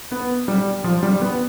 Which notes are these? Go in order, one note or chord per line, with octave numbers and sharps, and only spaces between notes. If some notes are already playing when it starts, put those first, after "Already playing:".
B3
G3
F3
G3
B3